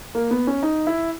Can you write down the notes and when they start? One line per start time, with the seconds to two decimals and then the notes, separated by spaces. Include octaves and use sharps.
0.15 A#3
0.31 B3
0.47 C#4
0.63 D#4
0.87 E4